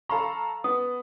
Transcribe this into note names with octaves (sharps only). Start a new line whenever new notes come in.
A4 F5 A#5 B5 C#6
B3 D#6